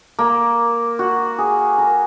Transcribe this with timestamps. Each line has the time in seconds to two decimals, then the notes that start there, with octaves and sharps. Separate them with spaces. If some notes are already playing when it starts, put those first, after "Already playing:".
0.19 A#3
0.99 F#4
1.39 G#4
1.78 A#4